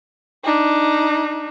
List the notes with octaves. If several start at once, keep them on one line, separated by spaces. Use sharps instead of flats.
D4 D#4